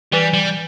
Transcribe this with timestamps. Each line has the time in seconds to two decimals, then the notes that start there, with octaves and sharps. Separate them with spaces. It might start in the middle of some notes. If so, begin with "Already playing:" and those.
0.13 E3 G3
0.34 G3